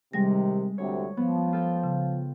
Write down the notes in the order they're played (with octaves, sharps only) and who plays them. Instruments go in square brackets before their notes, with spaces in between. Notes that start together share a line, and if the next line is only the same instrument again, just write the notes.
[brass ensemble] C3 D#3 [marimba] G3 A#6 [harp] G#3
[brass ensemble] D2 C3 [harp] C#5
[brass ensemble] F3 [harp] B3
[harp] F4 A4 G5
[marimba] C#3